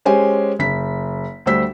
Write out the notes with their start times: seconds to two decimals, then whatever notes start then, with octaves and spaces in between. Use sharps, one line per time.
0.05 G#3 C#4 G4 C5 G#5
0.59 F#1 B6
1.46 D2 G3 C5 E6 B6